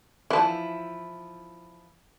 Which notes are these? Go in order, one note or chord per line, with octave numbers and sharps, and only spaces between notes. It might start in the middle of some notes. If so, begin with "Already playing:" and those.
E3 F3 E4 A5